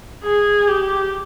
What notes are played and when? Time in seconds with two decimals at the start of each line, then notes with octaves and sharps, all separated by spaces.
0.24 G#4
0.68 G4